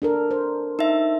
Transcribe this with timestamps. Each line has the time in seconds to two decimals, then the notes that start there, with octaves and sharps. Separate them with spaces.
0.02 D4 A4 A#4
0.31 C5
0.79 D#4 E5